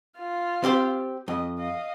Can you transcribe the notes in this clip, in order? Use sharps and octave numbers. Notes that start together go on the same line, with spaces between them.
F4 F6
C4 G4 C5
F2 D#5
D#5 F5